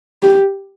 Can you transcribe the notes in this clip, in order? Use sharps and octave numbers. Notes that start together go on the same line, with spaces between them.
G4